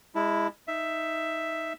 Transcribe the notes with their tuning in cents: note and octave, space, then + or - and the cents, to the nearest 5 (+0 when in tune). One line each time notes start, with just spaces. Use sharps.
G#3 -25 E4 +0 A5 +0
D#4 +10 E5 +5